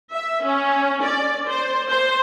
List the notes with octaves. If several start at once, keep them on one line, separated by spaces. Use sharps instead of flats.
E5
C#4
D5
C5
C5